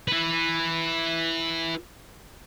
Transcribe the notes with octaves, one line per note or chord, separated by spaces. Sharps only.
E4 B4